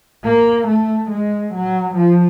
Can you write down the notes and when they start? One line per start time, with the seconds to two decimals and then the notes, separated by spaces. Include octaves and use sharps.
0.24 A#3
0.68 A3
1.11 G#3
1.54 F#3
1.96 F3